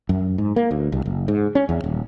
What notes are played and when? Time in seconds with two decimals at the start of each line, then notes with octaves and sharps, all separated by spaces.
0.09 F#2
0.38 G#2
0.56 A#3
0.71 D2
0.92 C2
1.06 F#1
1.28 G#2
1.55 C#4
1.69 E2
1.84 D#1